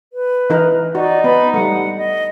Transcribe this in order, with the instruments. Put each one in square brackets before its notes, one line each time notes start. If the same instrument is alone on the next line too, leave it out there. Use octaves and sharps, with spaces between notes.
[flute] B4
[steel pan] E3 D#4 A#4
[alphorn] D#4 [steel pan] F#4 [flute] D5
[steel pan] B3 [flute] B5
[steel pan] G3 A3 [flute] F#5
[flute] D#5